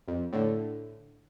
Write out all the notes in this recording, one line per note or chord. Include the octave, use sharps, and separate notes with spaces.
F2
A2 D3